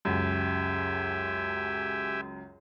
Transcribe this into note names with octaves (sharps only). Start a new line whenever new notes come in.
C#2 F#2 G4 E5 G#5